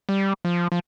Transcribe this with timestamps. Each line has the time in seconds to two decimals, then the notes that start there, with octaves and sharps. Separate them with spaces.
0.09 G3
0.45 F3
0.72 F3